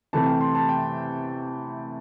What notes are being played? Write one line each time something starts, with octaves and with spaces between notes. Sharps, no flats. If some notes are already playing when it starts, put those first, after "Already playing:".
C3 E3 A3 C4 A5
G5
C6
A5
G5